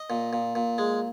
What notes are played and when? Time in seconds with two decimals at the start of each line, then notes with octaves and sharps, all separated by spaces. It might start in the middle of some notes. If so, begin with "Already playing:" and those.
Already playing: D#5
0.10 A#2
0.33 A#2
0.55 A#2
0.78 G#3